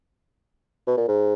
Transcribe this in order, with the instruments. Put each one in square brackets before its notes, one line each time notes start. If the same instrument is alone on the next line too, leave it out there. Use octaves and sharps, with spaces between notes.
[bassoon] B2
A#2
G#2